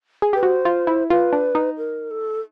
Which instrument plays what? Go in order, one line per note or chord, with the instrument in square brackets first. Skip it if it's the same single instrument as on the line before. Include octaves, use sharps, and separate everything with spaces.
[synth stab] G#4
[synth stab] G4 [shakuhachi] B4
[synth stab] F#4 [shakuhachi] C5
[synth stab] F4
E4
[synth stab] F4 [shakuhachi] B4
[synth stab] D4
D#4
[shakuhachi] A#4
A4